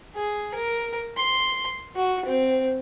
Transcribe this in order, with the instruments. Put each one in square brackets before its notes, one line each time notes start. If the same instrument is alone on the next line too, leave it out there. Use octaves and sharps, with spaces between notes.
[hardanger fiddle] G#4
A#4
C6
F#4
C4